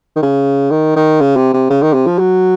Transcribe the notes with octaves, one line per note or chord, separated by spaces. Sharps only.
D#3
C#3
D#3
D#3
C#3
C3
C3
C#3
D#3
C3
F3
F#3